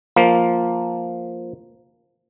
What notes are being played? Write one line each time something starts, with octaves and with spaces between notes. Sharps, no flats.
F3 A#3